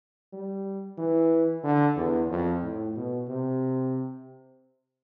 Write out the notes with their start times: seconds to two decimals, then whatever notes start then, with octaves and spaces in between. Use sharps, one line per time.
0.33 G3
0.98 E3
1.64 D3
1.97 E2
2.30 F2
2.63 A2
2.96 B2
3.29 C3